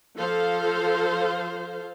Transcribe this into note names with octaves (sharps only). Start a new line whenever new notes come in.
F3 A4 C5 F5